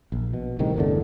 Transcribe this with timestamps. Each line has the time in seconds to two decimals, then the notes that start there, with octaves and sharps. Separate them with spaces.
0.12 A#1
0.33 B2
0.59 C2 A2 C3 D#3
0.76 G1 E2 A2 D3